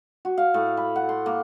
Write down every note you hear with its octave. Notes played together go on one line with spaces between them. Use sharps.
F#4
F5
A2
B5
F#5
C6
A#3